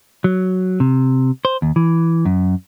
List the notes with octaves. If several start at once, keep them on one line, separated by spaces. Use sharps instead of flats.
F#3
C3
C5
D#2
E3
F#2